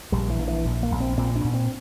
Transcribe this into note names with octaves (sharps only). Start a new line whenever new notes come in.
A#1 G3
E3
A#1
E3
A#1
A#3
A#1
C4
A#2 C4
D4
A#2
C4